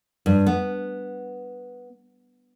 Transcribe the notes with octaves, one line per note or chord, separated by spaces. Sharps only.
G2
B3